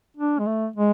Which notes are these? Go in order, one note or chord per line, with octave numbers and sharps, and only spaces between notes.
D4
G#3
A3
G#3